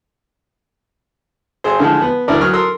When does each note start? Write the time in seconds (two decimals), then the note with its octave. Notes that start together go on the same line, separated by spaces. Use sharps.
1.64 G#1 G#4 C5
1.79 A2 D3 E3 F3 G#3
2.02 B3
2.28 D2 G2 E3 E4 A#4 D5
2.41 F#3 C#6 D#6 F6
2.53 A4 A#4 C6 D#6 E6